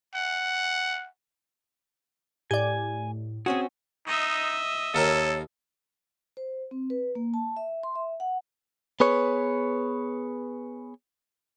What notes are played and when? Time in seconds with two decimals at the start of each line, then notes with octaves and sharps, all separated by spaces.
0.14 F#5
2.51 A2 G4 D5 G#5
3.46 C4 C#4 F#4 G#4
4.07 D#4 D#5 E5
4.95 D#2 A4 A#4 C#5 G5
6.37 C5
6.71 C4
6.90 B4
7.15 A#3
7.34 A5
7.56 E5
7.83 C6
7.95 E5
8.20 F#5
9.00 B3 G#4 B4 C#5